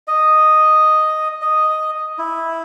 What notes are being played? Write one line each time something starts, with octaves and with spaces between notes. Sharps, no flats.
D#5
D#5
E4